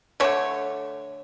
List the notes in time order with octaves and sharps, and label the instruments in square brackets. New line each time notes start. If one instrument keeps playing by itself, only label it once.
[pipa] D3 A3 C#4 C#5